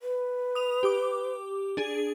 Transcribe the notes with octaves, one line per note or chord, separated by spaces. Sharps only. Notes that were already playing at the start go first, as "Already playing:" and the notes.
B4
D#6 F7
G4 D6
D4 G#4